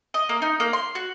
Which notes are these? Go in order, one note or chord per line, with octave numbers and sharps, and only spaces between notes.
D#5
A#3
D#4
A#3
C6
F#4